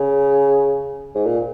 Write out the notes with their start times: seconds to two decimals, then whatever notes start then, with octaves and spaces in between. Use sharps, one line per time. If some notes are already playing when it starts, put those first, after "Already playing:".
Already playing: C#3
1.15 G#2
1.26 A#2